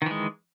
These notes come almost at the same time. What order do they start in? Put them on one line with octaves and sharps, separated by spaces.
D#3 E3 G#3